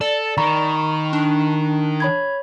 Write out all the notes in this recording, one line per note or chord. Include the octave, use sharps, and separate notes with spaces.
A4 D5
D#3 A#5 B5 C#6
D4
C#5 B5 G#6